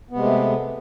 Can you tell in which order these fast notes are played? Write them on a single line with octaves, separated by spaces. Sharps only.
B3 C3 G#3 A3